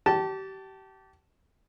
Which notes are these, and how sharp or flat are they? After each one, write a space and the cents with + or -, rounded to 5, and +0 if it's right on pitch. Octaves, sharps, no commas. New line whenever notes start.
G4 -30 A5 +0